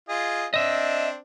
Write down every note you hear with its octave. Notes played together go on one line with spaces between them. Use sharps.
F4 G#4 D#5
C4 D4 D#5 E5